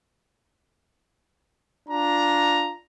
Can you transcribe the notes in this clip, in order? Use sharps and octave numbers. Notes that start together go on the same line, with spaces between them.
D4 F4 A#5